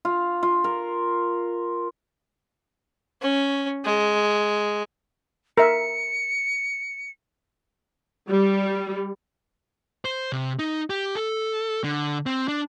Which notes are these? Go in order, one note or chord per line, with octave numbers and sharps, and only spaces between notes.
F4
F4
A#4
C#4
G#3
A#4 E5 C#7
G3
C5
C3
D#4
G4
A4
D3
C4
D4